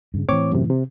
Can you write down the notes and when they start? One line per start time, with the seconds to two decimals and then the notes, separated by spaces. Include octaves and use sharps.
0.14 G2 C#3
0.29 A2 E3 C4 C#5 D6
0.52 F#2 C3
0.70 C3